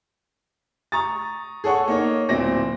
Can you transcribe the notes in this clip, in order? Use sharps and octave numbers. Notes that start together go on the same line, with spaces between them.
A#5 C#6 D#6 A6
G#4 A4 C#5 F#5 C#6
A#3 D#4 C#5
D1 A#2 C4 A#6